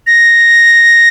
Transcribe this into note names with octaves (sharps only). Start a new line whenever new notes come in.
A#6